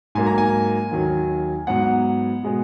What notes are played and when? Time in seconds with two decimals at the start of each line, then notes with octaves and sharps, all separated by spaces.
0.15 G#2 F#3 A#3 G#5
0.26 A#5
0.38 G#5
0.91 D#2 D#3 F#3
1.67 G#2 F#3 B3 F#5
2.43 B2 G#3 B3